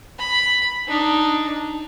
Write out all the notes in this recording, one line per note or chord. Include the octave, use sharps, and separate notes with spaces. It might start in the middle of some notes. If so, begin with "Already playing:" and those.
B5
D4 D#4